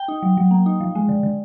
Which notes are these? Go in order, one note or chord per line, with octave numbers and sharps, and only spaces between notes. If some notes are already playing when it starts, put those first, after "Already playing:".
Already playing: G5
D#4
F#3
F#3
A#3
D#4
F3
G#3
D3
D3